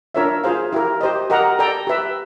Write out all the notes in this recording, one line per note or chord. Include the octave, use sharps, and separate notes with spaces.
D4 F4 A#4 C#5 E5
F4 G#4 C5 F5
E4 G4 A#4
G4 C5 D#5
G4 A#4 D#5 F#5 A#5
A4 D5 G5 A#5
G4 B4 E5